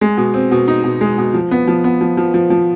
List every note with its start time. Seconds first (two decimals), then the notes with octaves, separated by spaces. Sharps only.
0.01 G#3
0.17 B2
0.34 C4
0.51 B2
0.68 D#4
0.84 B2
1.01 G#3
1.18 B2
1.34 F3
1.51 B3
1.68 F3
1.84 B3
2.01 F3
2.17 F3
2.34 F3
2.50 F3